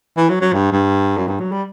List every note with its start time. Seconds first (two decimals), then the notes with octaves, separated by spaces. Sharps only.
0.17 E3
0.29 F#3
0.41 F#3
0.53 G2
0.72 G2
1.17 F#2
1.28 G2
1.40 F#3
1.52 G3